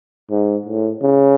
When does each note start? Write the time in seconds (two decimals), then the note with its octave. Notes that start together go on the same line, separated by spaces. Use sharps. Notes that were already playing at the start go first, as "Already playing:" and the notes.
0.30 G#2
0.66 A2
1.02 C#3